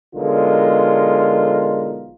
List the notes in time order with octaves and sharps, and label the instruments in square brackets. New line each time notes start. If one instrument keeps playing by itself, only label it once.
[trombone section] B1 D3 G#3 F4 A#4